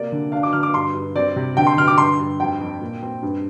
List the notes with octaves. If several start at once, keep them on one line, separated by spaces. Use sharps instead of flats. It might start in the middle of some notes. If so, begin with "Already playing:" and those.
Already playing: C3 A#3 D5
D3
D4 F5
D6
D3 F6
D6
G2 C6
G2
C4 D5
C3
D3 G5
C6
D3 F6
D6
G2 C6
G2
F2 G5
F2
A#2
C4
G2